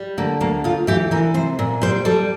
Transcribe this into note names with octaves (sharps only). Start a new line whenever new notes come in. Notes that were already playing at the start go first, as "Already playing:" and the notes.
Already playing: G3
D3 A#3
D2 A#3
D2 F4
E3 G4
E3 A#4
C3 C5
A#2
G3 C5
G3 A4